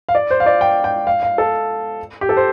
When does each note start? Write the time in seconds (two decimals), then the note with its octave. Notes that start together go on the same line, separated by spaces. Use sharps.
0.09 F5
0.15 D5
0.31 C5
0.40 F5
0.46 D5
0.61 G5
0.84 G5
1.07 F5
1.23 F5
1.38 A4
2.21 G4
2.29 A4
2.37 C5